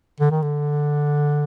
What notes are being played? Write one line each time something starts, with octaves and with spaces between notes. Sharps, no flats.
D3
D#3
D3